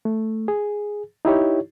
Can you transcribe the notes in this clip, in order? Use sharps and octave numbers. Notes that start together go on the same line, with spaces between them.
A3
G#4
D#4 E4 G4 C#5